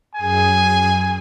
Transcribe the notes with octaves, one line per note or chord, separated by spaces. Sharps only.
F#2 G#4 G#5